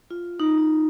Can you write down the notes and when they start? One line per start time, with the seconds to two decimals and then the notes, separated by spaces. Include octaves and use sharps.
0.11 F4
0.40 D#4
0.58 D#4